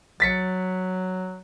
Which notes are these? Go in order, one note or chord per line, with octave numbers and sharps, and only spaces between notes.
F#3 A6 B6 C#7